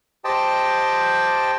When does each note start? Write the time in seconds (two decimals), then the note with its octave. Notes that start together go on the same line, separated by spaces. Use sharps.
0.25 G4 C5 D#5 G5 A5